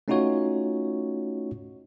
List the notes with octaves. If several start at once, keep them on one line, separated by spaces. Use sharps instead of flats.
A3 C#4 D#4 F4 F#4 C#5